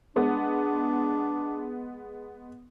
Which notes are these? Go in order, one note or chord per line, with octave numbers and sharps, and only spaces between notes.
G#3 B3 D4